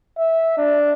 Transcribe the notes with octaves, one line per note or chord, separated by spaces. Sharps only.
E5
D4